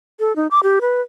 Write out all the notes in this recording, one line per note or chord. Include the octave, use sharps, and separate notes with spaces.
A4
D#4
D6
G4
B4